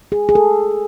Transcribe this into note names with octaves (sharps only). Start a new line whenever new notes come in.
G#4
G#4
A4